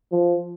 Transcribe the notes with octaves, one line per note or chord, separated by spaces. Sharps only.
F3